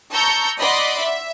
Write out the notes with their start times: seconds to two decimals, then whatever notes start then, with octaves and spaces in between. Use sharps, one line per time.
0.11 A5 A#5 C#6 E6 G6 C#7
0.60 D5 D#5 F#5 B5 C6 D6
0.99 E5